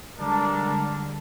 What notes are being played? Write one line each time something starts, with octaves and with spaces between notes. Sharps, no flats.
D3 G3 G#3 D4 A#4 A5